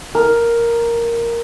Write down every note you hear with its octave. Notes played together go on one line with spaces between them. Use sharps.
A#4